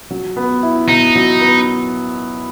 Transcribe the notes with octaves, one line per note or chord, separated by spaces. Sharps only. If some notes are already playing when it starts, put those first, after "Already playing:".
F#3
B3
E4
B2 D#4
F#3
B3